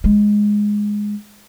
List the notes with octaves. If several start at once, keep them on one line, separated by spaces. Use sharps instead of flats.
G#3